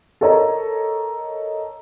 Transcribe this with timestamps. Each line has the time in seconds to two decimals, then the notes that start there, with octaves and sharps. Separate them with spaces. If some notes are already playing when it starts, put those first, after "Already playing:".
0.21 A4 A#4 C#5 D#5 A#5